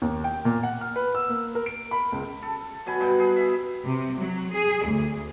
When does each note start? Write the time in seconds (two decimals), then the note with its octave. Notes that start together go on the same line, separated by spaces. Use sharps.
0.02 D#2
0.24 G5
0.45 A#2
0.63 F#5
0.81 F6
0.96 B4
1.15 E6
1.29 A#3
1.55 A#4
1.66 D7
1.91 B5
2.12 C#2
2.43 A4
2.86 B2 F#3 G#5 B5
3.00 G2 B2 G5
3.20 G#4
3.36 E5
3.85 C3
4.18 F#3
4.53 G#4
4.85 D2